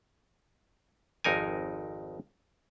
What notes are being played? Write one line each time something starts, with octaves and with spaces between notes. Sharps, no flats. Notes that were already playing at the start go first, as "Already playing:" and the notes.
G#1 F2 D#4 A#4 G#5